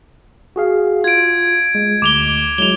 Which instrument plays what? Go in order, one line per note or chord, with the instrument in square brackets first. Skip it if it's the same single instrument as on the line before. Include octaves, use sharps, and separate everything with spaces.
[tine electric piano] F#4 G#4 F5
[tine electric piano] F4 [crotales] G#6 D7
[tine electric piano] G#3
[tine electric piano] D2 [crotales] D6 F7 G7
[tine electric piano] F#3 G#3 E4 [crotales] F7 G7